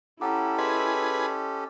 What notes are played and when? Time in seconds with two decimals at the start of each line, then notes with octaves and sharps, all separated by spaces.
0.21 C#4 E4 G4 A4 F#5 A#5 D6
0.58 G#4 B4 D#5 C6